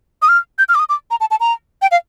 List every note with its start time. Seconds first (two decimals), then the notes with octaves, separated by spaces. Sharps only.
0.22 D#6
0.29 F6
0.59 G6
0.69 F6
0.75 D6
0.79 D#6
0.89 D6
1.11 A#5
1.20 A5
1.31 A5
1.40 A#5
1.82 G5
1.91 F5